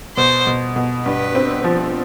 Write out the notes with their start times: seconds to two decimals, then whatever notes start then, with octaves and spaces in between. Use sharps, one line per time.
0.17 B2 C5
0.47 B2
0.76 B2
1.05 G2 B4
1.35 C4
1.64 F3